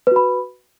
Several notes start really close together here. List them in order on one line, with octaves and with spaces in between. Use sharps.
B4 F#4 B5